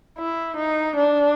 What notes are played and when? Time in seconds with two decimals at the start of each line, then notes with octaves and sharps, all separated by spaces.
0.18 E4
0.57 D#4
0.96 D4